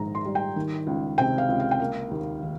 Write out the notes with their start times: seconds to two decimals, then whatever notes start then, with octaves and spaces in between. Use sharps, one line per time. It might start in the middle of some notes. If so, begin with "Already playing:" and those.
Already playing: A#1 G#2 D#3 A#5
0.15 C6
0.25 G3
0.35 G5
0.56 D#3
0.87 C#2
1.18 C3 G5
1.38 F5
1.49 C#2
1.60 F5
1.71 G5
1.80 A#3 F5
2.11 D#2
2.43 D#3